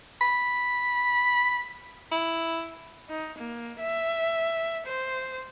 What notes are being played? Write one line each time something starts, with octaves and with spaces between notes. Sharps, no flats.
B5
E4
D#4
A#3
E5
C5